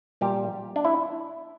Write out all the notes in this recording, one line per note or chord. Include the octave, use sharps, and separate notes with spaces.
A#2 G3 G4
D4
E4